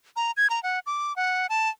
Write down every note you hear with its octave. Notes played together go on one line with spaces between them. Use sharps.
A#5
G#6
A#5
F#5
D6
F#5
A5